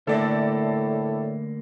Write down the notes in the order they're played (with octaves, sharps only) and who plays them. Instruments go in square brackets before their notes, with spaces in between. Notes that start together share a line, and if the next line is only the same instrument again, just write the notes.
[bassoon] A2 [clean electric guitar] D3 A3 A#3 [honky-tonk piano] A4 D5 E5